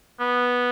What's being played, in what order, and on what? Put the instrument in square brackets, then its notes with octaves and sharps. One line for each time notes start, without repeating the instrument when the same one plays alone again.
[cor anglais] B3